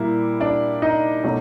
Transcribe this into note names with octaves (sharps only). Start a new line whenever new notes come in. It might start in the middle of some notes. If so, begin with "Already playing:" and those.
Already playing: A#2 G3 A#3 E4
D4 D5
D#4 D#5
B2 F#3 A3